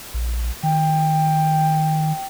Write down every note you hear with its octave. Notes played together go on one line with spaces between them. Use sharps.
A#1
D#3 G5